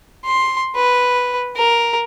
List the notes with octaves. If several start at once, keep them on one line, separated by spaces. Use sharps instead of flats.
C6
B4
A#4